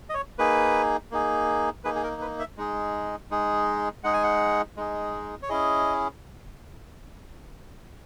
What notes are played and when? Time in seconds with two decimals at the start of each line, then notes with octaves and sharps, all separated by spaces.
0.09 D#5
0.14 C#5
0.38 A#3 D#4 G#4 B4
1.11 A#3 D#4 G#4
1.84 A#3 D#4 G#4 B4
1.95 G#4
2.03 A#4
2.21 B4
2.39 E5
2.57 G#3 D#4 G#4
3.31 G#3 D#4 G#4
4.04 G#3 D#4 G#4 F#5
4.13 G#5
4.23 F#5
4.77 G#3 D#4 G#4
5.43 C#5
5.49 C#4 E4 G#4 D#5